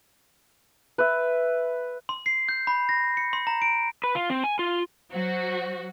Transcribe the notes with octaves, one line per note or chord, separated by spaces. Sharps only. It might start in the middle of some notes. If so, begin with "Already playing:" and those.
B4 E5
C6
C7
G6
B5
A#6
C#7
C6
A#5
D7
B4
F4
C4
G#5
F4
F#3 F#4 C5